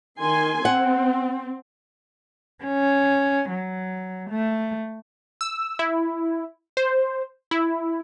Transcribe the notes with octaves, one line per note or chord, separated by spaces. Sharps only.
D#3 G#5 C6
C4 F#5
C#4
F#3
A3
E6
E4
C5
E4